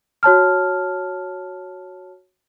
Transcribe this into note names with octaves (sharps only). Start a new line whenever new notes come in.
F#4 C#5 A5 F6